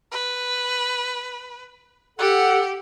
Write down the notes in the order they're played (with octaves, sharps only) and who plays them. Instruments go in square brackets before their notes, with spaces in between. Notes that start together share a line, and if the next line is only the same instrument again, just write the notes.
[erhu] B4
[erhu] G4 [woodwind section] A4 F#5